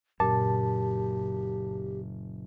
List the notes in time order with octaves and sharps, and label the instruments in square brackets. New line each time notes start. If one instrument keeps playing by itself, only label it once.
[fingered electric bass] F#1 F#2 [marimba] A#2 [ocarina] G4 [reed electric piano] A5